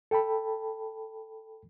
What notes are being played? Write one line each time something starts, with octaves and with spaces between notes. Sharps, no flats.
A4 G5 A5 B5